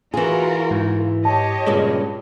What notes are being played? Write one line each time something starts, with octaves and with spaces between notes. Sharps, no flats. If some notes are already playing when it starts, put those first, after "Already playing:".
E3 F4 F#4 G#4 A#4
G#2
G4 C#5 D#5 A5
G2 A#2 C#3 G#3